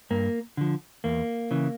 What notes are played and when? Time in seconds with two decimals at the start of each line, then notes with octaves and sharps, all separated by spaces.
0.10 G2 A#3
0.57 D3 F3
1.04 E2 A#3
1.51 C#3 E3